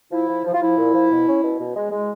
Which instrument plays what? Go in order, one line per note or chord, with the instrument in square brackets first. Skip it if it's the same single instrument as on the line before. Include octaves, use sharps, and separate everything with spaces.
[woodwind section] F3 E4
F3
F3
F4
F3 E4
A#2
F3
B2
C#4
B2
B2
G#3
G#3